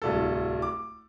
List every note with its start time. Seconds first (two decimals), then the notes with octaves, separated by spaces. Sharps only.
0.02 D1 C2 A4
0.62 D6